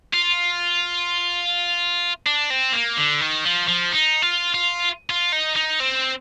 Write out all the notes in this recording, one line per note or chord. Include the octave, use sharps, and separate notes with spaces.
F4
D4
C4
A#3
D3
D#3
F3
F3
D#4
F4
F4
F4
D#4
D#4
C4